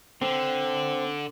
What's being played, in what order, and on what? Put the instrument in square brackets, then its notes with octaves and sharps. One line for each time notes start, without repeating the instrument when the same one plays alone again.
[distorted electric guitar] D3 [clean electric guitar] C4